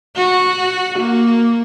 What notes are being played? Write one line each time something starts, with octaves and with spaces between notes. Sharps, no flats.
F#4
A#3